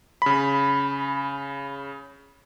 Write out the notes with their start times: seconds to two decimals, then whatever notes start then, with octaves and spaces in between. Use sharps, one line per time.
0.22 C#3 B5